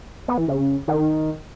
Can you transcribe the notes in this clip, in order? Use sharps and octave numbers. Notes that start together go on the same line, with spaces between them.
B3
E3
C#3
D#3